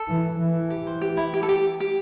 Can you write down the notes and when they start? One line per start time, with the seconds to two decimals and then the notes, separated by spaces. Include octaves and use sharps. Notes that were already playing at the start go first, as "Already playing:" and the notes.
Already playing: A4
0.08 E3
0.40 E3
0.70 G4
0.87 C5
1.01 G4
1.17 E4
1.33 G4
1.43 A4
1.49 G4
1.80 G4